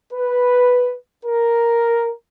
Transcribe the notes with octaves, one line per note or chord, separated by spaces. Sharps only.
B4
A#4